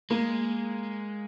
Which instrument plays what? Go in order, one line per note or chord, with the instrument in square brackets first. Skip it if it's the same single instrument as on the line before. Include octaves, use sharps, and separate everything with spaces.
[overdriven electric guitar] G#3 [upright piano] A#3